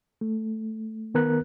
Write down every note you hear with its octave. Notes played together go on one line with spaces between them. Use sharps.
A3
D#3 B3 A#4 F#6